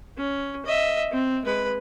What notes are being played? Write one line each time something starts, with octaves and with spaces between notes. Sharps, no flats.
C#4
D#5 E5
C4
G#3 B4